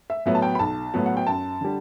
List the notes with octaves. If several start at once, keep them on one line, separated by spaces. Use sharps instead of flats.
E5
A2 F#3 B3 E5
A5
G5
B5
B1 A5
A2 F#3 B3
F#5
G5
F#2 A5
D3 G3